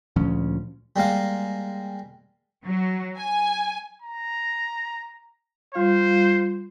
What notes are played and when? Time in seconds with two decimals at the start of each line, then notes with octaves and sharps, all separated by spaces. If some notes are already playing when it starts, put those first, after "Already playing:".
0.16 D2 A#2 F3 C#4
0.96 G3 G#3 A#3 F5
2.66 F#3
3.17 G#5
4.02 A#5
5.75 G3 F4 C5 F5